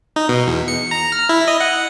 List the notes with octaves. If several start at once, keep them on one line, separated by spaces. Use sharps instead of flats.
D#4
B2
E2
C#7
A#5
F6
E4
D#5
F#5